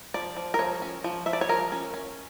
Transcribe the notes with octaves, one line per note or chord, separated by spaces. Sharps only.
F3 D5
F3
A#4
F3 C#5
C#4
F3
F3 E5
D5
C#5
F3 A#4
C#4
C#4